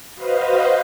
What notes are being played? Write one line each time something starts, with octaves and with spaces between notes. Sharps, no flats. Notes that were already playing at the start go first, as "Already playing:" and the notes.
F#4 B4 C5 D#5 F5